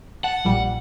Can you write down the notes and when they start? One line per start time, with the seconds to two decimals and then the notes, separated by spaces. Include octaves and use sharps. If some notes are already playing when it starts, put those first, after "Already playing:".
0.24 F#5 A5
0.45 A#1 A#2 G3